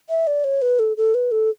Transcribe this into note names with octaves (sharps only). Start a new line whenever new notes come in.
E5
D5
C#5
B4
A4
A4
B4
A4